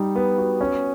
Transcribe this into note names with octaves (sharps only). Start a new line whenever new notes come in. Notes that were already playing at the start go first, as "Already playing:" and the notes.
Already playing: G3 D#4
B3
F#4
C#4